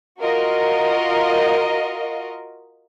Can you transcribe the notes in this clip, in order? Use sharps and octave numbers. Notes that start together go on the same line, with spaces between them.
F4 F#4 A#4 D#5